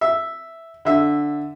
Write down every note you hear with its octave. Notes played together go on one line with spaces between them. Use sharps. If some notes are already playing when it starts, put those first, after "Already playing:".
E5
D3 E5